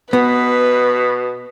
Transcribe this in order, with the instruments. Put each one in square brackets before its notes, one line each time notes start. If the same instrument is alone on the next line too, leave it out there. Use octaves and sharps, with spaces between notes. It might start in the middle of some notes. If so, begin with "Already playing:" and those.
[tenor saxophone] B2 [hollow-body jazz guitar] B3 [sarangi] B4